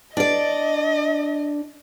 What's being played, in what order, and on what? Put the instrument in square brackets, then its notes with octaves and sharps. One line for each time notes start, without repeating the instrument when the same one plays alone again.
[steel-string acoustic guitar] D4 D5 [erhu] D#5